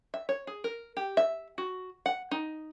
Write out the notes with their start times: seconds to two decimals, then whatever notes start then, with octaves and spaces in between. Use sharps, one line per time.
0.14 E5
0.29 C#5
0.47 G#4
0.64 A#4
0.97 G4
1.17 E5
1.58 F#4
2.06 F#5
2.31 D#4